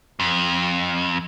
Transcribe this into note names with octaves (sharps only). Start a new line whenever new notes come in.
F2